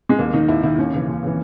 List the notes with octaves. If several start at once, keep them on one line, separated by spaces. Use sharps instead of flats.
G#3
D#2 A#3
D#3 D#4
D#2 E4
D#3 E4
D#2 C#4
C#3 E3
D#2
C#3 E3